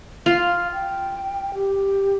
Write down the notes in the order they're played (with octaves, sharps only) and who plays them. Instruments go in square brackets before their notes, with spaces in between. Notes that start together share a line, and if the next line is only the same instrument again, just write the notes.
[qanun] F4 [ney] F5
[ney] G5
G4